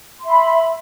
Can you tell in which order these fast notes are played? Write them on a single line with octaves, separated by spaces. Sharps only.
C6 E5 B5